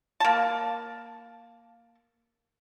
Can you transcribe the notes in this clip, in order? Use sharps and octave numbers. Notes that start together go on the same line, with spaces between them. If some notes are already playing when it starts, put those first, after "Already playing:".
A#3 A5